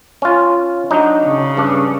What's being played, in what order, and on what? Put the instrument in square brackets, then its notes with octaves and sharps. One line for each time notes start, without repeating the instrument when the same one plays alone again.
[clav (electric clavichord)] C#4 F4
F#3 D4 D#4
[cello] C#3
[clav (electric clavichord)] G2 D4